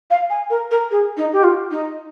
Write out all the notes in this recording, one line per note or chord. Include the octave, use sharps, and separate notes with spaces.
F5
G#5
A#4
A#4
G#4
D#4
G4
F4
D#4